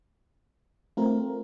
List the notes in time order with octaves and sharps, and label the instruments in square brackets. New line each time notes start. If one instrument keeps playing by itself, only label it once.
[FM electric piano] A3 C4 F4 A#4